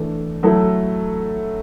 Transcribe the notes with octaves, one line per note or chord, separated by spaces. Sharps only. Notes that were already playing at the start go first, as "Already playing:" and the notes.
Already playing: E3 A3 D4
F#3 A3 E4 A4